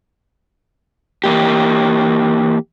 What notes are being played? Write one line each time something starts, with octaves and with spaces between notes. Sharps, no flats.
E3 A#3 G4